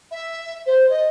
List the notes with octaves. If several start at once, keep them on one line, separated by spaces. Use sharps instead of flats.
E5
C5
D#5